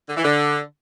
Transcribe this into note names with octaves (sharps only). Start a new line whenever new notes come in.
D3
E3
D3